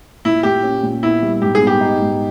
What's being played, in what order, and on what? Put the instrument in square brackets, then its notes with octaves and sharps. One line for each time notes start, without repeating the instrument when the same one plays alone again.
[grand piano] A#2 [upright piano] E4
[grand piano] A#2 [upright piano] G4
[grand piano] C#4
A#2
[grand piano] B3 [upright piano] E4
[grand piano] G3
[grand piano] G#2 [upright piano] G4
[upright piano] G#4
[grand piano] B3
[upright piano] G4
[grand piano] D#4
G#2